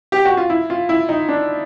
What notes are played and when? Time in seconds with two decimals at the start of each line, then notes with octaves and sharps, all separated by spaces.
0.12 G4
0.25 F#4
0.37 F4
0.50 E4
0.70 F4
0.89 E4
1.09 D#4
1.29 D4